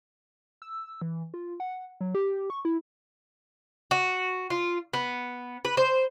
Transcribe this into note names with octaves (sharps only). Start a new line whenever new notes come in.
E6
E3
F4
F#5
F#3
G4
C#6
E4
F#4
F4
B3
B4
C5